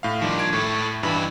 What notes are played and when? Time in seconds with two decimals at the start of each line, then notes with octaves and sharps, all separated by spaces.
0.03 A2 F5
0.22 D#3 F3 G3 D4
0.39 G#6 D7
0.53 A2 A4 C#5
1.03 G2 D#3 E3 B5